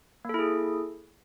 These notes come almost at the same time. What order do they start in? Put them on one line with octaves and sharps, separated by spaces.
A#3 A4 E4 G#4